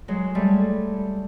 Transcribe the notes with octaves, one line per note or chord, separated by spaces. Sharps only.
F#3 G#3
G3 A3